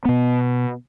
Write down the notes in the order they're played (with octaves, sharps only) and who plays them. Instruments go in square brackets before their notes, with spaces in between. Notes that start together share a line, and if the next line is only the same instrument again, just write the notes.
[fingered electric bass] B2 B3